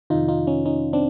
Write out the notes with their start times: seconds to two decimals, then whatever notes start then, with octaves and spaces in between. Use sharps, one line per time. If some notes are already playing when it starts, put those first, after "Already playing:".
0.10 F2 C3 D#3 D#4 F4
0.28 D#4 F4
0.47 C#4 D#4
0.66 C#4 D#4
0.93 C4 D4